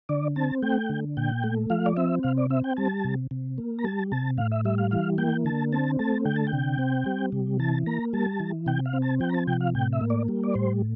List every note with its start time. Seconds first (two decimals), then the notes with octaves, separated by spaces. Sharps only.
0.09 D3 D5
0.36 C4 A5
0.62 A3 G5
0.89 D3
1.17 A#2 G5
1.44 A3
1.70 F3 F5
1.86 D5
1.97 C4 E5
2.23 C3 F5
2.37 D5
2.50 C4 E5
2.64 G5
2.77 G3 A5
3.04 C3
3.31 C3
3.58 A#3
3.79 A#5
3.84 G3 A5
4.12 C3 A5
4.37 A2 F5
4.52 E5
4.65 G3 E5
4.78 F5
4.91 E3 F5
5.18 A#3 G5
5.45 D3 A5
5.72 C4 A5
5.99 A3 A5
6.25 D3 G5
6.36 A5
6.47 G5
6.53 C3
6.79 C4
7.06 G3
7.32 C3
7.59 E3 A5
7.86 A#3 A#5
8.13 G3 A5
8.40 E3
8.66 C3 G5
8.85 F5
8.93 C4
9.02 A5
9.20 F3 G5
9.29 A#5
9.34 A5
9.47 C3 G5
9.60 F5
9.75 A2 G5
9.93 E5
10.01 A#3
10.10 D5
10.28 G3
10.43 D5
10.54 A2 C5